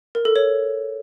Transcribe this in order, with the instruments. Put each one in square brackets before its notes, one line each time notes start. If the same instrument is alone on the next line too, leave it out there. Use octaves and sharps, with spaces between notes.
[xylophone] A#4
A4
C#5